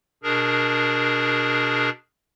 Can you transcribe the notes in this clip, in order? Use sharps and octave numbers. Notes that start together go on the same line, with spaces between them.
B2 D4 G#4 A#4